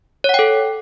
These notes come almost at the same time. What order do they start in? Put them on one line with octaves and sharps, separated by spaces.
C#5 F#5 G5 A4